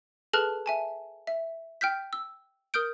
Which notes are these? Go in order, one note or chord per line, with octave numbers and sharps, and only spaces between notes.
G#4 A4 B4 A5 F6 F#6
E5 G#5 A5
E5
G5 F6 G6 B6
E6
A#4 D#6 F6 G6 D7